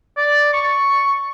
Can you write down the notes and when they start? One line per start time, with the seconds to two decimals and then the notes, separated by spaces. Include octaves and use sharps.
0.17 D5
0.53 C#6